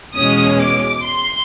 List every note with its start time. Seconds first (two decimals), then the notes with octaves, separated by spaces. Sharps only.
0.15 E2 B2 G#3 C#4 D#6
0.60 D6
1.05 C6